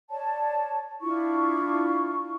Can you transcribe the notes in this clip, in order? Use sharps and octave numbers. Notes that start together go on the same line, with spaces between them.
C#5 D5 A5
D4 E4 F4 C#6